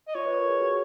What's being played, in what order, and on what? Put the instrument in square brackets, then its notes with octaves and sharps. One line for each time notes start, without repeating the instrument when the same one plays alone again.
[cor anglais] D#5
[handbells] F4 [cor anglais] C#5
[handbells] B4
A#4
G#4
F#4